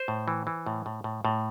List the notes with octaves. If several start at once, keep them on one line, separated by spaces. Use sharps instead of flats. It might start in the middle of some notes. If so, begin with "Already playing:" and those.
Already playing: C5
A2
E3
E3
A2
A2
A2
A2